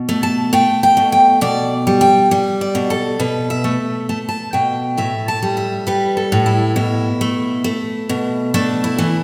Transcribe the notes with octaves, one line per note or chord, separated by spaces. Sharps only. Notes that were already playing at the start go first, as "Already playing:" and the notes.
Already playing: B2
A3
A5
A3 G5
G5
B2
G5
B2 D5
G3
G5
G3
D5
B2
A4
B2 B4
E5
A3
A3 A5
A5
B2 G5
A2 E5
A5
G3
E5
G3 B4
A4
A2
E4
B2 E4
A3
A3
B2
A3 D4
E4
E3